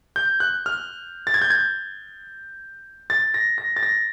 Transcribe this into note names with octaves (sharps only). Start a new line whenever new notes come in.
G6
F#6
F6
A6
G#6
G6
G#6
A6
A#6
A#6
A6
A#6